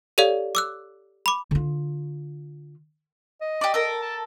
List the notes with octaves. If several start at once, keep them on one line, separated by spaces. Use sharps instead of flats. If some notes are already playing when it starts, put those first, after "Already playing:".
G4 A4 C#5 D5 F5
D6 E6 F#6
B5 D6
D3 F4
D#5
G4 D5
A4 A#4
A5